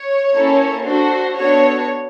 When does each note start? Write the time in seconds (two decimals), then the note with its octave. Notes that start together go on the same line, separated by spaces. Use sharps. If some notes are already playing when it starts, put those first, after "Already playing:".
Already playing: C#5
0.33 A#3 C#4 E4 A4
0.84 D4 F#4 A4 C5
1.36 B3 D4 F#4 A4 C#5